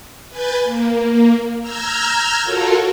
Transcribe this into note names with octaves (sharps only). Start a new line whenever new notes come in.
B4 G#5 G6 A6
A#3
A#5 E6 F6 G6 G#6 A#6
F4 F#4 A4 A#4 C#5